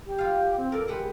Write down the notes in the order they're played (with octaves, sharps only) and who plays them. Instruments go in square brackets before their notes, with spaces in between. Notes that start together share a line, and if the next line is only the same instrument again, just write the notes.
[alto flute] G4
[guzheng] F4 F5
[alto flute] C4
[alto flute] A4 [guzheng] A#4 D5
[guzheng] G#3 B4 F#5 [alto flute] G4